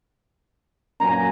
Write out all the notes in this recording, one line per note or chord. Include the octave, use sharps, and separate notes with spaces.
F#2 A#2 G#5 A#5